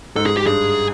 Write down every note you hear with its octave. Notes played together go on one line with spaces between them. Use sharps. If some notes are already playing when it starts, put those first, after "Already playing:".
G#2 A4
G#4
G4
G2 G#4